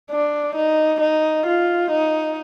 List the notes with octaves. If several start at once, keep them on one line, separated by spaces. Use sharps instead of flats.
D4
D#4
D#4
F4
D#4